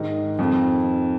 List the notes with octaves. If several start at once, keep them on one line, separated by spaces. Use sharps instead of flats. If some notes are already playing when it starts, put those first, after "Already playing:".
Already playing: G#2 D#3 D#4
F2 D#3